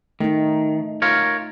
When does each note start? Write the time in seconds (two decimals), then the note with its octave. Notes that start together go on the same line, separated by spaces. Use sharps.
0.20 D#3 A3 D#4
1.02 F4 A#4 C#5